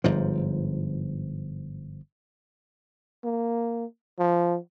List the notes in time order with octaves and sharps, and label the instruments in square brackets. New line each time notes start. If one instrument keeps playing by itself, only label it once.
[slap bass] G1 G#2 F3
[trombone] A#3
F3